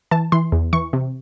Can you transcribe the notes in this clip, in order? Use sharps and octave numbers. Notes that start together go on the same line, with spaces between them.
E3 A5
E3 C6
E2
E3 C#6
C3